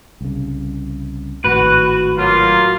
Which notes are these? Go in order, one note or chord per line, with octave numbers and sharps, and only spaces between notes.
C2 C#3
G#1 A2 F#4 B4
F#3 A#3 F4